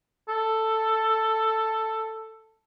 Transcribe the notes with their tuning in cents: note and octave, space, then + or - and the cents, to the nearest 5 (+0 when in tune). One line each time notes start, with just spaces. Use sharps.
A4 +5